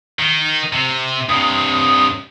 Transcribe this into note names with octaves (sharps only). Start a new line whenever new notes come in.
D#3
C3
G2 C3 D#6